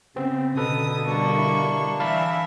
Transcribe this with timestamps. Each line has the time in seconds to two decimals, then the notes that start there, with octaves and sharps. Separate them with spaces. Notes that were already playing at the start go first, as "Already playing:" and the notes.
0.16 C#3 B3 C4
0.57 B2 D3 A4 B4 D#6
1.06 G3 A#3 D4 C#6
1.38 E4
2.00 E3 E5 F5 A5 B5